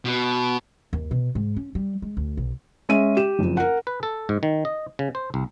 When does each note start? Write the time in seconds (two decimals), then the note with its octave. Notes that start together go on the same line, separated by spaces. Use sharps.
0.05 B2
0.93 D#2
1.11 B2
1.35 G#2
1.56 C#4
1.75 G3
2.02 G#3
2.17 D2
2.37 B1
2.89 G#3 C#4 E5 D#7
3.17 G4 E7
3.39 F#1 F2
3.57 A#4 F#5
3.87 B4
4.03 A4
4.29 G#2
4.43 D#3
4.65 D#5
4.99 C#3
5.15 C5
5.34 C2